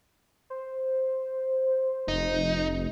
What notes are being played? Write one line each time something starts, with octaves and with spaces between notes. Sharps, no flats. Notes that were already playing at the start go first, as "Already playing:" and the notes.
C5
F1 D#4